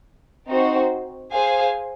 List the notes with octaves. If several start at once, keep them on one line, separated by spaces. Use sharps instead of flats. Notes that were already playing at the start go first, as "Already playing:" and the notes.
C4 D#4 F#4 C5
G#4 C5 F5 G#5